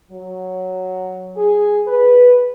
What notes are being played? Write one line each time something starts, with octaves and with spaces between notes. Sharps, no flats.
F#3
G#4
B4